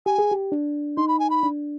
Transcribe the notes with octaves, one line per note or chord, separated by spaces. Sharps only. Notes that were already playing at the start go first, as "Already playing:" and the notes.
G4 G#5
G#4
G4
D4
D#4 C6
B5
G#5
B5
D4